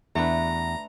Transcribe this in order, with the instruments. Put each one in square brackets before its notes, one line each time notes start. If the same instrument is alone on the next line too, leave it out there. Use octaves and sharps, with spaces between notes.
[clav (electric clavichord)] E2 [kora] A3 D4 B4 [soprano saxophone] A#5